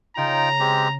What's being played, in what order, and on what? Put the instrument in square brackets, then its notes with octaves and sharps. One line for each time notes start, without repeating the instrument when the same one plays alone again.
[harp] C#3 [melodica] D#4 F4 G5 [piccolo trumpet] A#5
[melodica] G#3 C4 G4